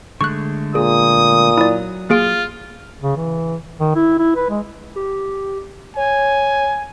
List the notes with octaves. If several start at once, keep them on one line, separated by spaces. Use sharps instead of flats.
D3 G#3 A3 C#6 F#6
A#2 G#4 D#6
F#3 E4 D5
A#3 F4 G#4 D7
C#3
E3
D#3
E4
E4
B4
G#3
G4
C#5 G#5